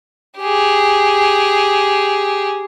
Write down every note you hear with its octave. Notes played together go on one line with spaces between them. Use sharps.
G4 G#4